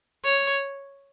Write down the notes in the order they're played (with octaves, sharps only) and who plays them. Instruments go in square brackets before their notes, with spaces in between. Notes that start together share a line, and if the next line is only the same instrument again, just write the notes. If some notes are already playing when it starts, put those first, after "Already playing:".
[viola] C#5